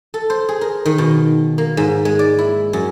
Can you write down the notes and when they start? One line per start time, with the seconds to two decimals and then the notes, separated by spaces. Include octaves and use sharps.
0.14 A4
0.30 C5
0.49 G#4
0.61 A#4
0.85 D#3
0.98 B2
1.58 A#3
1.77 G#2
2.05 G#3
2.19 D5
2.39 E4
2.73 F#2